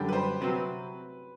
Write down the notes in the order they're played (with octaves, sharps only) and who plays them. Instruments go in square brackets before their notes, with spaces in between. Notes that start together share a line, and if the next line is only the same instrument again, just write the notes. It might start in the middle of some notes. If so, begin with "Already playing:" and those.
Already playing: [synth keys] F#2 D3 G3 [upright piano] G4
[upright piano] B4
C5
[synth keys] C3 F#3 C4 [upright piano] B4